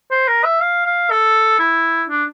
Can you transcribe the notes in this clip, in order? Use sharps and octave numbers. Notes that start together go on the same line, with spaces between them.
C5
A#4
E5
F5
F5
A4
E4
D4